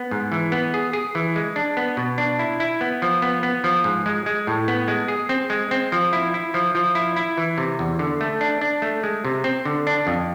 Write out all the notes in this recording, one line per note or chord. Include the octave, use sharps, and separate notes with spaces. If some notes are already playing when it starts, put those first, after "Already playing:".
Already playing: B3
G#2
E3
B3
G#4
G#4
E3
G#3
D4
B3
B2
D4
E4
E4
B3
F3
B3
B3
F3
G#2
G#3
G#3
A2
B3
G#3
G#4
C4
G#3
C4
F3
E4
E4
F3
F3
E4
E4
E3
C3
E2
D3
A3
D4
D4
A3
G#3
C3
C4
D3
D4
F2